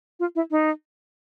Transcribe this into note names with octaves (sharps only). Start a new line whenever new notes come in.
F4
E4
D#4